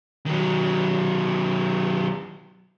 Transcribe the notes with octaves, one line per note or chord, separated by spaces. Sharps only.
D#3 F#3